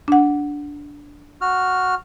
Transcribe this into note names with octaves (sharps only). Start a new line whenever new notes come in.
D4 F#5
F#4 F6